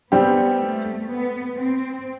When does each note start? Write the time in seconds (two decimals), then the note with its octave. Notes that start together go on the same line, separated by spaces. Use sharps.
0.12 G3 B3 C4 G4
0.62 A3
1.11 B3
1.60 C4